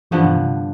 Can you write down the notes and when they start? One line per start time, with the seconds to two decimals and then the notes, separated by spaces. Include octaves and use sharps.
0.11 G2 D3 E3 F3 B3
0.25 B2
0.36 C3